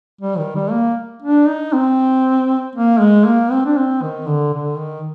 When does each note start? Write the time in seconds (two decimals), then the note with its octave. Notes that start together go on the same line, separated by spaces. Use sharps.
0.21 G3
0.38 D#3
0.56 G3
0.72 A#3
1.22 D4
1.48 D#4
1.73 C4
2.76 A#3
3.00 G#3
3.26 A#3
3.51 C4
3.66 D4
3.77 C4
4.02 D#3
4.28 D3
4.54 D3
4.78 D#3